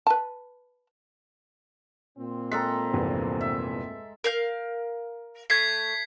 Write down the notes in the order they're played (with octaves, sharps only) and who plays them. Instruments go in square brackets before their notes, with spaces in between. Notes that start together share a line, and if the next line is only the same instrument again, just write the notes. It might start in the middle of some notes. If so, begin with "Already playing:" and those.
[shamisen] B4 A5
[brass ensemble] A#2 C4
[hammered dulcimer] G#3 A4 A#5 [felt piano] B6
[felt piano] F1 E2 G2
[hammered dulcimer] E5
[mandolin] A#4 F5 G6
[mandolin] A3 [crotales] G#6 B6 C7